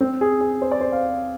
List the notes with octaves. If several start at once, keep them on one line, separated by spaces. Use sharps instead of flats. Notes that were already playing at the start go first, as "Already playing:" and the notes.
C4
G#4
G#4
C5
D5
C5
F5